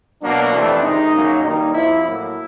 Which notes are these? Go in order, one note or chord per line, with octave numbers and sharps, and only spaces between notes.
B2 F#3 A#3 D4
F2 C3 E3 A3 C4
C3 D#3 G#3 D#4
F#2 C#3 F#3 A#3
G2 D#3 G3 A#3 D#4
F2 C3 F3 E4
A2 F#3 A#3 E4